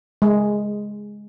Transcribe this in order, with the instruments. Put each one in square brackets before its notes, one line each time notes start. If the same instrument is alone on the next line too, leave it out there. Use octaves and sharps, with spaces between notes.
[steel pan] G#3